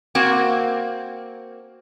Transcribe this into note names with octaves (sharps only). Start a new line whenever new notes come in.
A#3 C4 F#4